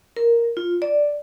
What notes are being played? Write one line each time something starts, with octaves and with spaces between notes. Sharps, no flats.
A#4
F4
D5